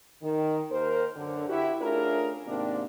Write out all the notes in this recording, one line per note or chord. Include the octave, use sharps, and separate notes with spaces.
D#3
D#2 A#4 C5
F#2 D3
E4 F#4 G4
A3 C#4 D4 F4 G#4 A#4
G#2 C3 D#3 A#3 C4 D4